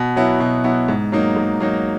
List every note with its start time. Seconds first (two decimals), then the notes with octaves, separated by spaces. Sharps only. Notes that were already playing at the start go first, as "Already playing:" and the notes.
Already playing: B2
0.16 F#3 B3 E4
0.40 B2
0.64 F#3 B3 E4
0.88 G#2
1.12 F#3 A#3 D#4
1.36 G#2
1.60 F#3 A#3 D#4